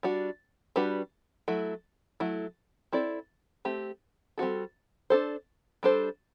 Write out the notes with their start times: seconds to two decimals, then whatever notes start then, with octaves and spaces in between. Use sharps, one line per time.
0.03 G3 D4 F#4
0.76 G3 D4 F#4 B4
1.48 F#3 A3 E4
2.20 F#3 A3 E4
2.93 C4 E4 A4 D5
3.65 A3 C4 G4
4.38 G3 C4 F#4 A4
5.10 D4 A4 C5
5.83 G3 D4 A4 C5